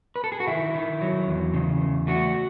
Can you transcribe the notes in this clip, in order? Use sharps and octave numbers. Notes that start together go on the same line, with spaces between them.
B4
A4
G#4
F#4
D#3 E4
D#3
F#3
E2
C#3
E2
A3 F#4